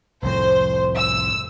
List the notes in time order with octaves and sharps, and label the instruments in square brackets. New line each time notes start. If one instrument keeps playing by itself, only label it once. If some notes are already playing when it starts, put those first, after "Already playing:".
[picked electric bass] C2 F2 A2 [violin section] C5
[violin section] E6